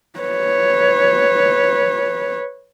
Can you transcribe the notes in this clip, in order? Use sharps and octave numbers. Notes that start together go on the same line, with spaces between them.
B4 C#5